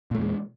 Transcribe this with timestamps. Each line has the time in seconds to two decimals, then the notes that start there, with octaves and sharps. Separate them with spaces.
0.11 A#2
0.15 A3
0.18 E2
0.22 G#3